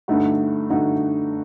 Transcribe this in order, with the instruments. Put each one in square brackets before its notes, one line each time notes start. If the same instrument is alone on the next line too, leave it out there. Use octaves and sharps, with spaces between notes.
[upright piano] G2 D3 A3 D#4 F#4
G2 D3 A3 D#4 F#4